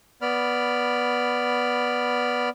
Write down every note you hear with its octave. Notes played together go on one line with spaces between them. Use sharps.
B3 D5 B5 F6